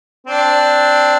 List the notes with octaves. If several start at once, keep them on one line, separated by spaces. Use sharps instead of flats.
C4 D4